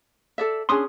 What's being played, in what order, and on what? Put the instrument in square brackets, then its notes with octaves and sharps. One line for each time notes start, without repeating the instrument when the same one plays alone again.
[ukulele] A4 D5 E5
[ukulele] C#4 D4 G#4 [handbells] C6 D#6